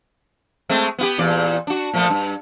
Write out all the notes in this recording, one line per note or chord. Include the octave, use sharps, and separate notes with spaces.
G#3 A3 C4
B3 F4 G4
E2 A#2 D5
D4 F#4
A#2 F3 A3
G2